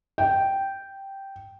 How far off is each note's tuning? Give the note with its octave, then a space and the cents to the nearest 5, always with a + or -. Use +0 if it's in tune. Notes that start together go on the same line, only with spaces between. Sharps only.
G5 -5